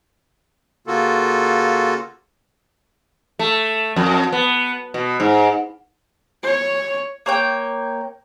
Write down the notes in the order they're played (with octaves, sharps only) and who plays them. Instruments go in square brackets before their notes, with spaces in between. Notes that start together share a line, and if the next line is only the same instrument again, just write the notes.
[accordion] C#3 A#3 F4 F#4 A4
[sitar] A3
F2
B3
B2
G#2
[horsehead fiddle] C#5
[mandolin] A#3 C#5 G5